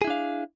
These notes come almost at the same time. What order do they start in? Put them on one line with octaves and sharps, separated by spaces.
G#4 E4 D4 F5